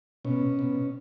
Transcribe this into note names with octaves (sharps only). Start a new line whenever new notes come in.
B2 C#4
B2